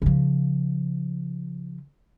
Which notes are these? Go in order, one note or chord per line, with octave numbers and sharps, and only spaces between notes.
C#3 F3